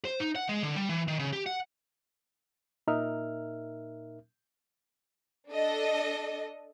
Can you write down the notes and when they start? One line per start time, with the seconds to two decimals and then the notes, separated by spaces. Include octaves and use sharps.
0.05 C5
0.20 D#4
0.36 F#5
0.49 G#3
0.63 D3
0.76 G3
0.89 E3
1.08 D#3
1.19 C#3
1.33 G4
1.46 F#5
2.87 A#2 D#4 A#4 E5 F6
5.50 D4 A4 D#5